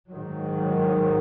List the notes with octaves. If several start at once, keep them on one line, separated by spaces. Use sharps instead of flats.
G#2 D#3 F#3